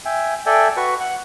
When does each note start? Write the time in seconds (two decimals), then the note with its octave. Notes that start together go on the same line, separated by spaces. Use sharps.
0.05 E5 G5 G#5
0.46 A4 D5 E5 G5 G#5
0.77 F#4 B4 C#6
1.00 F#5 F#6